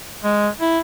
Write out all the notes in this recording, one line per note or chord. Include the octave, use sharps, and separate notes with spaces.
G#3
E4